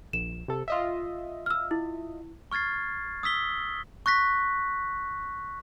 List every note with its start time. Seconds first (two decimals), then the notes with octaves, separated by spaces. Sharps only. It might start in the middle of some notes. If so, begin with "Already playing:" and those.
0.13 A#1 E7
0.48 C3 A4
0.68 F4 D#5 E5
1.46 E6 F6
1.71 E4
2.52 C#6 F6 G#6 A6 C7
3.23 D#6 E6 B6 G7
4.06 C#6 F#6 A#6 B6